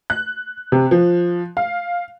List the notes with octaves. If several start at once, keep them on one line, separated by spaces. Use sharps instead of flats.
F#6
C3
F3
F5